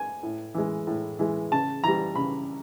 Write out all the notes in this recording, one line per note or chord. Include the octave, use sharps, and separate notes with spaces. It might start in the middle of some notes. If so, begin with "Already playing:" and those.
Already playing: G#5
A2
E3 G#3
A2
E3 G#3
C#3 A5
E3 G3 A#5
C#3 B5